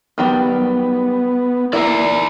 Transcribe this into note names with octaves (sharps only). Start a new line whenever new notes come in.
D#3 F#3 G3 B3
A#3 E4 D5 E5 A#5